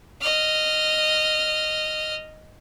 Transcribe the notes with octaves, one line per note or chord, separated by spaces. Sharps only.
D#5 F6